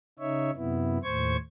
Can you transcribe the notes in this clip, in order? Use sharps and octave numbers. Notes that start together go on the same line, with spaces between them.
C#3 D#4 C#5 E5
F#2 C3 B3 E4
D#2 A2 C5 C#6 G#6